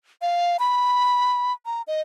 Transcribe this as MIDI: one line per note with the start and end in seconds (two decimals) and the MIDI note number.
0.22 0.57 77
0.59 1.53 83
1.66 1.82 82
1.87 2.02 75